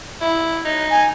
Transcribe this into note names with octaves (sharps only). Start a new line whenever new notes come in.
E4
D#4
G#5